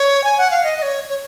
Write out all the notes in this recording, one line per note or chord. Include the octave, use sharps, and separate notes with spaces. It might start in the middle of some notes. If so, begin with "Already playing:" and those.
Already playing: C#5
G#5
F#5
F5
D#5
D#5
C#5
C#5